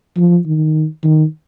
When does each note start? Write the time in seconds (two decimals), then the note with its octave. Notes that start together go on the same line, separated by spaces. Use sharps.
0.17 F3
0.46 D#3
1.04 D#3